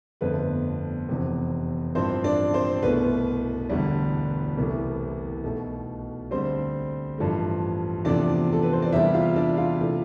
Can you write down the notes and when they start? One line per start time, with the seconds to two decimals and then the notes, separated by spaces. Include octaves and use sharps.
0.21 G1 F2 D3 A3 B3 B4
1.09 F1 E2 C3
1.95 A1 G2 F3 C4 C5
2.24 D4 D5
2.54 C4 C5
2.82 C2 B2 A3 B3 B4
3.70 E1 D2 D3 G3
4.57 C2 C3 E3 A3
5.44 B1 B2 A3
6.31 D2 D3 G3 C4 C5
7.18 A1 G2 F3 A3
8.05 E2 C3 F3 A3 D4 D5
8.52 A4
8.63 B4
8.73 C5
8.82 D5
8.92 E2 C3 G3 E4 E5
9.14 F4 F5
9.36 D4 D5
9.57 F4 F5
9.81 C3 E3 A3